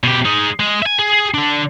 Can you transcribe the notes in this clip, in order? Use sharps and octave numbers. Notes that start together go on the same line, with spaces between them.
B2 G4
G#3 D#4
G#3
E5 G#5
G#4
D3 D4